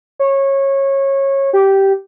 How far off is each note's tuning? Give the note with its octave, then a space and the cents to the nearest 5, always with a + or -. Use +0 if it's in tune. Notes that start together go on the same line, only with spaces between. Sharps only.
C#5 -20
G4 -10